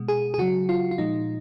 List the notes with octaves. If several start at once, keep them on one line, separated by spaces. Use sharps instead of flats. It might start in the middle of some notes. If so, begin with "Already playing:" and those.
Already playing: B2 G#3
G#4
G#4
C#3 F#3 F#4
F4
F4
A#2 F3 G#3 D#4